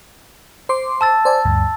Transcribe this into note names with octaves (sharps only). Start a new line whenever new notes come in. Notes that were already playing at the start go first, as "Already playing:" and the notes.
C5 C6 D6
A5 E6 A6
C5 D5 G#5
D2 G2